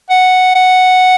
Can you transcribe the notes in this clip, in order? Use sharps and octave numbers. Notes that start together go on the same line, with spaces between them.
F#5
F#5